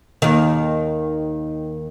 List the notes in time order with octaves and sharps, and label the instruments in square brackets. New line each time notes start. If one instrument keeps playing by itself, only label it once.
[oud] D#2 D#3